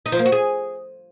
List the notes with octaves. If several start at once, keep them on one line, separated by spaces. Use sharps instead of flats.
D#4
F3
A#3
F#4
G#4